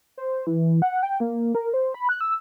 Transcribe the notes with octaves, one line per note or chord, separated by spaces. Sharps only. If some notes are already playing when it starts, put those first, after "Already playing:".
C5
E3
F#5
G5
A#3
A#4
C5
B5
F#6
E6